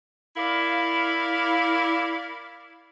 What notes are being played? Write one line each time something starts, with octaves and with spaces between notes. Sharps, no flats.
E4 A#4 D5 F5